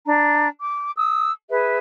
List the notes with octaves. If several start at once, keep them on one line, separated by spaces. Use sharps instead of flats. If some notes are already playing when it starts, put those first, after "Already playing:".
D4 A#5
D6
D#6 E6
G#4 B4 E5